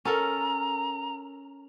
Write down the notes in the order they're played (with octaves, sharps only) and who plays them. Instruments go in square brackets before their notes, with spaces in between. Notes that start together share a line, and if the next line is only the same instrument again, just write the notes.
[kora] C#4 A4 A#4 [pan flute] A#5